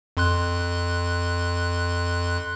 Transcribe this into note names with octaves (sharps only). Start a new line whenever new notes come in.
F2 C6 F#6